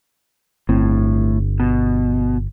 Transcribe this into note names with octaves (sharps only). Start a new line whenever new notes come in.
G1 A2 C4
B2